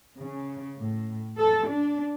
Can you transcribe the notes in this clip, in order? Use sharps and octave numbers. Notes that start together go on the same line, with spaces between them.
C#3
A2
A4
D4